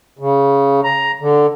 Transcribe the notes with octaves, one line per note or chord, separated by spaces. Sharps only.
C#3
A#5
D3